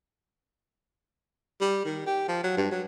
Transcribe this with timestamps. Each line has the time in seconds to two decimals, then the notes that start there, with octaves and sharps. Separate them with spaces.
1.61 G3
1.86 D#3
2.06 G4
2.28 F3
2.44 F#3
2.57 G2
2.72 F#3